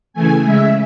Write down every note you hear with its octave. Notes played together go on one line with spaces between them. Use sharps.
C#3 E3 A3 G#5
C#3 G#3 E5